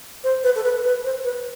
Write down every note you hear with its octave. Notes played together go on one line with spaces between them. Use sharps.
C5
B4
A4
B4
B4
C5
B4